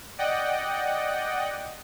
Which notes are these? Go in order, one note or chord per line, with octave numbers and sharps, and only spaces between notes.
D5 D#5 F#5 G5